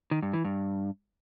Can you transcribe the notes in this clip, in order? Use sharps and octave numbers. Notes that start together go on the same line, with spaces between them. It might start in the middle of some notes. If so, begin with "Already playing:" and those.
D#3
G2
E3
G2